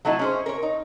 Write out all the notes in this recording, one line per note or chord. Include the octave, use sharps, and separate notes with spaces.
F#3 A3 D#4 E4
C#4 G#4 C5
A#4 C#5
D#4